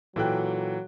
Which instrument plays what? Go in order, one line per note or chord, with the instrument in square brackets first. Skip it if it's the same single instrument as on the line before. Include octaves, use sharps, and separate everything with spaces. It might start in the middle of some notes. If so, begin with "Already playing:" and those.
[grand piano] A#2 A4 G5 [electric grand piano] E3 F#6 [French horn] F#3